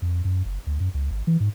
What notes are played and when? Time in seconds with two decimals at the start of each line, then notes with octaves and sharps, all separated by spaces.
0.02 F2
0.25 F#2
0.45 F#1
0.67 D2
0.80 F#2
0.94 C#2
1.11 G#1
1.27 E3
1.40 G#2